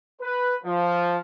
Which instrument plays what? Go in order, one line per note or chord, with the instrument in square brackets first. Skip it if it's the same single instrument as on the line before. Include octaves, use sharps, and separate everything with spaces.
[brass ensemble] B4
F3